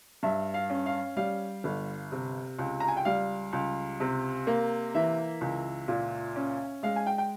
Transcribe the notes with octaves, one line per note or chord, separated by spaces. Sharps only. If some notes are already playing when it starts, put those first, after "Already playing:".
G2 E5
F5
C#4
F5
G3 F5
G1
C3
C#2
A#5
G#5
G5
G3 F5
C#2
C3
A#3
E3 E5
C#2
A#2
C#4
G#3 F5
G#5
G5
G5